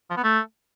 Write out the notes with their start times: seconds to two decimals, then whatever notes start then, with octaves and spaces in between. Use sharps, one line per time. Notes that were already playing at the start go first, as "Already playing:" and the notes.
0.10 F3
0.17 B3
0.24 A3